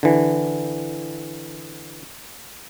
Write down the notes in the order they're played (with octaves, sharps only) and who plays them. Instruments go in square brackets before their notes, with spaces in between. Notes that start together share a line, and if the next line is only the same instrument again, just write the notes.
[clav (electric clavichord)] D3 E3